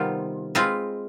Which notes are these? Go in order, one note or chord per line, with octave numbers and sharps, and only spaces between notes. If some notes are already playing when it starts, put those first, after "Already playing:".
Already playing: C3 D#3 G3 B3 F4
G#3 C4 F4 B4